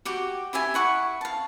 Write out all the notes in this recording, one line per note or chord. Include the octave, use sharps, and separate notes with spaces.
F#4 G4 D6
E4 G4 E5 G#5
E4 F#5 C#6
F5 A5